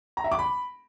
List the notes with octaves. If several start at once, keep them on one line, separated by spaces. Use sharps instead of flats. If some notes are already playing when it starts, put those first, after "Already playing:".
A#5
E5
D6
B5